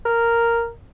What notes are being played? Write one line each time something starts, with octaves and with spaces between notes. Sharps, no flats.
A#4